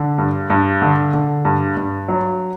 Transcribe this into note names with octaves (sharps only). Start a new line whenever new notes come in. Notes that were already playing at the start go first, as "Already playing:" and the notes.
Already playing: D3
G2
G2
D3
D3
G2
G2
F#3